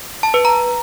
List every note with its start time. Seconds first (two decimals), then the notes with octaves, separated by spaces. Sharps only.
0.23 A5
0.34 B4
0.45 A#5